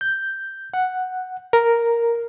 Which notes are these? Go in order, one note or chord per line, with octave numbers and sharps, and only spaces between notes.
G6
F#5
A#4